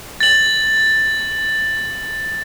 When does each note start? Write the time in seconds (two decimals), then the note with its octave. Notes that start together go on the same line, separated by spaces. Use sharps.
0.20 A6 F#7